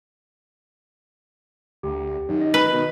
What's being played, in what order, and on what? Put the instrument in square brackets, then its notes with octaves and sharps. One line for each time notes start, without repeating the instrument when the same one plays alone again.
[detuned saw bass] D2 [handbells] G4
[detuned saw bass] F#2 [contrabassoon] D#3
[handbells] D#5
[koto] B4
[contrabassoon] B2 [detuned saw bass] D#3